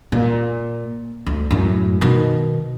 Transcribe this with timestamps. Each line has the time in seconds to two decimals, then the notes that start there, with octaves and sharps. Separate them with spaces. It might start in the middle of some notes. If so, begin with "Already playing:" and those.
0.12 A#2
1.26 D2
1.51 F#2 A2
2.01 B2 D#3